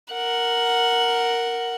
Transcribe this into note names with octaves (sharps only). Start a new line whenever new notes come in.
A#4 F#5